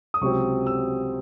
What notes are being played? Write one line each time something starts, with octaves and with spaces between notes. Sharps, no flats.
D#6
C#2 C3 F#3 C4 C#6
E6